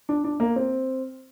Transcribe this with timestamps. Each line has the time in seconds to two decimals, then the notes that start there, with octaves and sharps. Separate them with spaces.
0.09 D4
0.24 D4
0.40 A#3
0.56 C4